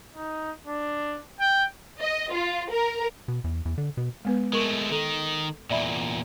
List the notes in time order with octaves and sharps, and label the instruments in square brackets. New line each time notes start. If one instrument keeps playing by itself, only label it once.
[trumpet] D#4
D4
G5
[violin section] D#5
F4
A#4
[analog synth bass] B2
E2
E2
D3
B2
[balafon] G#3 B3 B4
[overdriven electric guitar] G#3 A3 [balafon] A#4 C#6
[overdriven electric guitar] D#3 [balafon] A4
[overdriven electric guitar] E2 A#2 [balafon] D5 E5 B5